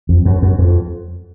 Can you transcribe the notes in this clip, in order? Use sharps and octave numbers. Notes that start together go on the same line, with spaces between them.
F2
F#2
F#2
F2